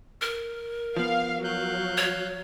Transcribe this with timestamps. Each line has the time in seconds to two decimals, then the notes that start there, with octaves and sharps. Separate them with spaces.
0.22 A#4
0.96 F3 B3 F5
1.44 F#3 F5 F#6 G6
1.97 C#5